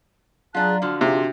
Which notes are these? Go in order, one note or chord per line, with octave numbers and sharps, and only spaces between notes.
F#3 D4 F4 G#4 A5 A#5 F#6
D3 F3 D4 F#4 F6
C3 D#4 F4 G#4